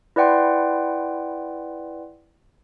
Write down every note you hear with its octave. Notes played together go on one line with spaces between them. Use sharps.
E4 B4 D5 F#5 G5 C6